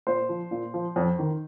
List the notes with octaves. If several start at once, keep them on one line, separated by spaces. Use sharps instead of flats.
A#2 C5
F3
A#2
F3
F2
D#3